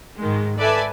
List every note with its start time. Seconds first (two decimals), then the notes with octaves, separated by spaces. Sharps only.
0.18 G#2 D#3 G#3
0.57 A4 B4 D5 E5 G#5 A5